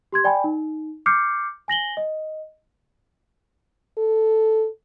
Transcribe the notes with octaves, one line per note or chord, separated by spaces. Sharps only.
G4 C6 G#6
D5 G5 G#5 B5
D#4
D6 F6 G6 C7 C#7
G#5 A#6 F#7 G7
D#5
A4